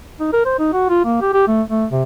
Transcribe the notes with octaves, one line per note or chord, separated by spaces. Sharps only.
D#4
A#4
C5
D#4
F#4
F4
A#3
G4
G4
A3
A3
C3